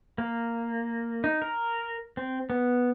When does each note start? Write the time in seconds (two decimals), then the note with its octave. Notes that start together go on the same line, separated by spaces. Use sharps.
0.18 A#3
1.24 D#4
1.42 A#4
2.17 C4
2.50 B3